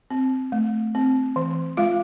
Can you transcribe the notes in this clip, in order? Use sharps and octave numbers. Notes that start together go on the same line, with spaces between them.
C4
A3
C4
E3
G#3 F4 F5